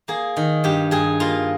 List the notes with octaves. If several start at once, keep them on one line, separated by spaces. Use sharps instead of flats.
A#3 G#4
D#3
G2 G4
G2 G#4
A#3 F4